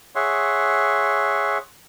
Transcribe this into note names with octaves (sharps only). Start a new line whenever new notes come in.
G#4 C#5 E5 F#5 C6